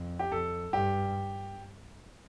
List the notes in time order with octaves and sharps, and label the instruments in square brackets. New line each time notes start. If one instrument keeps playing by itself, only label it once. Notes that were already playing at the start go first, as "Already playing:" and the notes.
Already playing: [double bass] F2
[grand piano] G4
[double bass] F2 [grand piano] A4
[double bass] G2 [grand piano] G4